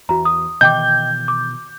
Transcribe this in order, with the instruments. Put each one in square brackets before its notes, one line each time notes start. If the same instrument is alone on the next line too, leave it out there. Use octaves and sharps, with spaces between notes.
[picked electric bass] E2 [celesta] F#4 A#5
[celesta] D#6
[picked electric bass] B2 D#3 E3 [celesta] D#5 G5 D6 [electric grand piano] G6
[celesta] D6